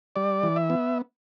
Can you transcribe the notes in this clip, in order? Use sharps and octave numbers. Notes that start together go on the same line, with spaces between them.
G3 D5
E3
E5
B3